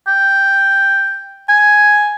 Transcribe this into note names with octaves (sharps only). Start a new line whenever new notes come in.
G5
G#5